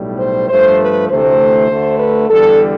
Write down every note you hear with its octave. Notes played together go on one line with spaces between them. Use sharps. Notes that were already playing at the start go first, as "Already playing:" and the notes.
Already playing: B1 A2 G3
C5
G2 F3 A3 C5
B4
D2 C3 E3 A3 C5
D2 D3 A3
B4
E2 D3 G3 A4